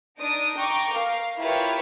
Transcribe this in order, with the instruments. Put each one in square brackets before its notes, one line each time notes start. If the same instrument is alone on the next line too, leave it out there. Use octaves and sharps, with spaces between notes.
[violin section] D4 D#4 D#6 D7
G5 A#5 C#6 D6
A#4 F5
E4 F4 G4 A#4 B4 C#5